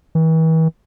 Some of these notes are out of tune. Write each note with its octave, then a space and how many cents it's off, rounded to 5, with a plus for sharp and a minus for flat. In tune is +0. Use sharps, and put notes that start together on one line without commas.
E3 -40